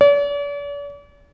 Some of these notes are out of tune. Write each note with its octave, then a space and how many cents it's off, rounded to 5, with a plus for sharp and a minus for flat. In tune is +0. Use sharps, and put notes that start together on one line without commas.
D5 -45